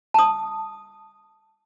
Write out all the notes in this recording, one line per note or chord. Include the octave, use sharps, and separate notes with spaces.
A5 D#6